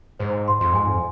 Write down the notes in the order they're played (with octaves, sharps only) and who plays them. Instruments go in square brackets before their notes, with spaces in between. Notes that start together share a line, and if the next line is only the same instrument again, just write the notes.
[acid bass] G#2 [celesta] C5
[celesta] C6
[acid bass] F2
[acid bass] G#2 [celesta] G#5
[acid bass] F2